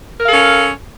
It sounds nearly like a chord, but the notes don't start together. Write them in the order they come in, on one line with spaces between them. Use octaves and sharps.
A#4 F5 A4 C#4